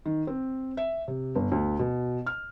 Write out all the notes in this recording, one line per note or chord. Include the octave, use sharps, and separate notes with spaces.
D#3
C4
E5
C3
G1
D2
B2
F6